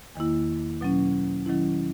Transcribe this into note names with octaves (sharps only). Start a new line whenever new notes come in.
E2 D#3 A#3 E4
B2 F#3 C#4
D#3 F#3 C#4 E4